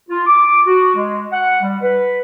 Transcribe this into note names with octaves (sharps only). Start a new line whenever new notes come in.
F4
D6
F#4
G#3
F#5
G3
B4